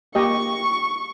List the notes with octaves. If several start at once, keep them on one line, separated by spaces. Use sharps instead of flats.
A#3 G4 D#5 C#6